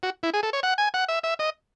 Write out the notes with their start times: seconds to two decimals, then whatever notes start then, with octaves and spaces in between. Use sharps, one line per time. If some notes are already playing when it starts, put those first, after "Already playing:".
0.03 F#4
0.23 E4
0.34 G#4
0.43 A4
0.53 C#5
0.63 F#5
0.78 G#5
0.94 F#5
1.09 E5
1.24 E5
1.39 D#5